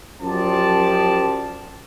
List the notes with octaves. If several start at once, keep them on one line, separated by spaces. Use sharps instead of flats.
F#2 F3 G4 D5 A5